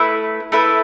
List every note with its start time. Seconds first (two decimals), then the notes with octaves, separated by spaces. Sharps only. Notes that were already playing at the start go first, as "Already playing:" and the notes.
Already playing: A3 E4 B4
0.52 A3 E4 B4